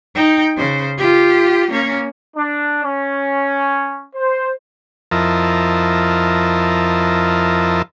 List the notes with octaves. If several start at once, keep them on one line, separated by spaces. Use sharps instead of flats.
D#4 G5
C#3 C5
F4 G4
A#3 C#4
D4
C#4
C5
F2 F3 E4 A#4 D#5 A5